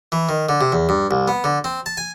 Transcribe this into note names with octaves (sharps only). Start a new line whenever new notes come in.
E3
D#3
D3
C3
E2
G2
C2
B3
D3
C4
A5
G#5